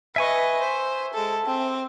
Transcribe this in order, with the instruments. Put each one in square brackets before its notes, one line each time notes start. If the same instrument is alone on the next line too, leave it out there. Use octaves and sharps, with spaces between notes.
[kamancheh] B4 D#5 [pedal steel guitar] E5 G#5 C#6
[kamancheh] C5
G#3 A4
C4